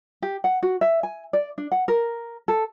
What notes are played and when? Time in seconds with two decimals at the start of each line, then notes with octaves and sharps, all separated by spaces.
0.22 G4
0.44 F#5
0.63 F#4
0.81 E5
1.03 G#5
1.33 D5
1.58 D4
1.72 F#5
1.88 A#4
2.48 A4